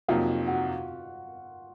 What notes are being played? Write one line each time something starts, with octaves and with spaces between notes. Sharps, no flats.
F2 C3 F#3 A#3 D#4 F4 F5
F#4 F#5